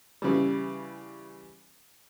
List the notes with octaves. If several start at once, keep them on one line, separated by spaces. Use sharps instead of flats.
C#3 E3 G3